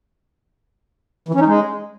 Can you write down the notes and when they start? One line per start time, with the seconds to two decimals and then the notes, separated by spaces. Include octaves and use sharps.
1.29 E3
1.34 C#4
1.40 D#4
1.46 G#3